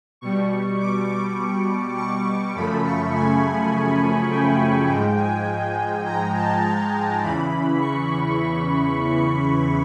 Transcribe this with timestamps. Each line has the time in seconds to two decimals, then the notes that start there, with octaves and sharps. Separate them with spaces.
0.21 B2 G3 C#6
0.79 D6
1.09 D6
1.97 C#6
2.55 F#2 C#3 F3 A3 B5
2.84 C#6
3.14 G#5
4.30 G5
4.89 G#2 F3 G#3 G5
5.18 G#5
6.05 A#5
6.35 A5
6.64 A#5
7.22 E2 C#3 E3 B5
7.81 C#6